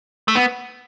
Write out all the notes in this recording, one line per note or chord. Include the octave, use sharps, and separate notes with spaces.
A3
B3